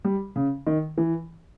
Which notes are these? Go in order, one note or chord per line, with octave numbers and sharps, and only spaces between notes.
G3
C#3
D#3
E3